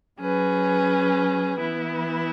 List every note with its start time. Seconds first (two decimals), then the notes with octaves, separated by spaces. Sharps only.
0.20 F#3 C#4 G#4 B4
1.58 E3 B3 E4